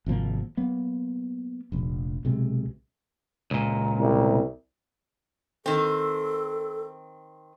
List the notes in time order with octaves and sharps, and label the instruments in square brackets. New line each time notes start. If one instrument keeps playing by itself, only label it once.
[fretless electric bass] G#1 C3 F3 A#3
F#3 A#3 B3
F1 A#1
B1 C3 G#3
[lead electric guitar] C#2 A#2
[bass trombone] C2
[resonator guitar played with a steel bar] D#3 C4 [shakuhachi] A4